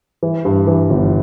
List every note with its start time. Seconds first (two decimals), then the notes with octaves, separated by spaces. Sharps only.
0.23 E3
0.45 G2
0.67 E3
0.90 G1